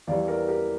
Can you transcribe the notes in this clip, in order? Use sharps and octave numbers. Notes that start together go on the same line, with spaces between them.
E2 E3 G3 D5 F5
A#4 D5
G4 A#4